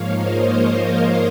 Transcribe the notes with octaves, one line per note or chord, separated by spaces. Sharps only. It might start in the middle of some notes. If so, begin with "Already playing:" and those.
Already playing: G#2 F3 A#3 C#5 F5
C5 D#5
A#4 C#5